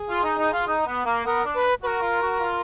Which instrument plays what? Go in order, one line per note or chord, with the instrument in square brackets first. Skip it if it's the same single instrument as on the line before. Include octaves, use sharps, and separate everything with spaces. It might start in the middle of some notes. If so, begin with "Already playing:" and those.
Already playing: [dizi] G#4
[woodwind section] F4
D#4
D#4
F4
D#4
B3
A#3
[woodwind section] B3 [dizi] A#4
[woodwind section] D4
[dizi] B4
[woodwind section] F#4 [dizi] B4
[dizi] A#4
[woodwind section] F4
F#4
F4